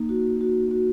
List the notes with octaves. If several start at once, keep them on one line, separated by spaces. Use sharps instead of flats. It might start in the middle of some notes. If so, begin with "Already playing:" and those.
Already playing: A#3 D#4
F#4
F#4
F#4